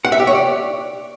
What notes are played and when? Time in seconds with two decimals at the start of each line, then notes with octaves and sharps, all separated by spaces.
0.05 F#5
0.12 E5
0.20 G4
0.27 C#5
0.35 D5